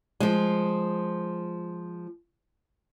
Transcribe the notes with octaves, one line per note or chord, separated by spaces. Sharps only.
F3 G#3